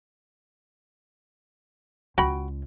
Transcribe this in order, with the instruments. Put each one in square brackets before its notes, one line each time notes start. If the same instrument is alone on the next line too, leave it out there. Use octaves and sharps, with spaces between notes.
[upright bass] C#2 [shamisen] F#4 G5 B5